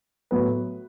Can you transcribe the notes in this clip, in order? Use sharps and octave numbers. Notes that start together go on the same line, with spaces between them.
A2 F#3 B3 B4